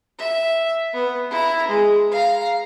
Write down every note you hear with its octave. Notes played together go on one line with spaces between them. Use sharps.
E5
B3
E4 A#5
G#3
F5 A#5